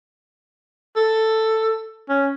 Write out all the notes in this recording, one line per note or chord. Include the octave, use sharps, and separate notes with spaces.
A4
C#4